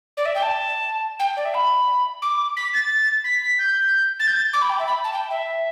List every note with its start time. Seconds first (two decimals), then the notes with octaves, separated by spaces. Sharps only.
0.17 D5
0.25 E5
0.35 G5
0.42 A5
1.19 G5
1.37 D5
1.45 E5
1.54 B5
2.22 D6
2.56 B6
2.73 A6
3.24 B6
3.42 B6
3.59 G6
4.19 A6
4.27 G6
4.36 A6
4.53 D6
4.61 B5
4.69 G5
4.79 E5
4.86 B5
5.04 A5
5.13 G5
5.30 E5